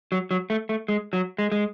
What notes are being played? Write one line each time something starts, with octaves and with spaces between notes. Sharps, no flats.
F#3
F#3
A3
A3
G#3
F#3
G#3
G#3